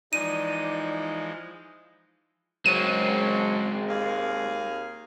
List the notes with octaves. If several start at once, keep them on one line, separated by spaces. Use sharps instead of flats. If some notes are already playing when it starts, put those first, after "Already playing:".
E3 F3 G#3 D#4 D5 D#7
C#3 F#3 G#3 C4 D#7
D#2 G#4 F5